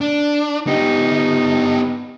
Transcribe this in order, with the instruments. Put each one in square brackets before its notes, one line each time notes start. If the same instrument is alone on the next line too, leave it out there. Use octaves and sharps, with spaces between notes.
[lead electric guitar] D4
[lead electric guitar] B3 G4 [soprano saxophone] D#4